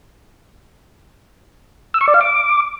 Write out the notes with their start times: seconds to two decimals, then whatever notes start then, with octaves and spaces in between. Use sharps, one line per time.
1.94 E6
2.01 C#6
2.07 D5
2.14 F5
2.21 D6